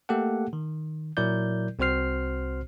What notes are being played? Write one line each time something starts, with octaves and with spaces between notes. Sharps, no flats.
A3 A#3 G4 A4 F#5
D#3
A#2 F#3 E4 A#4 D5 G6
C2 C4 F#4 C5 F6 C7